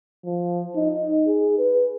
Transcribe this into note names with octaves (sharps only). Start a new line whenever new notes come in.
F3
D#4
G#4
B4